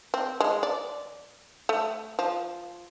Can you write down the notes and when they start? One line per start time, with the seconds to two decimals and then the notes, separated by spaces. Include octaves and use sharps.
0.14 C4
0.40 G#3
0.63 D5
1.69 A3
2.19 F3